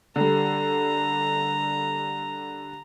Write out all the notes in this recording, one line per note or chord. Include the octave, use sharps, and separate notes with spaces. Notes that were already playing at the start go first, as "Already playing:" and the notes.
D3 G3 A#5